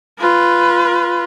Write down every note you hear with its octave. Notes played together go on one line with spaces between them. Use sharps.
F4 B4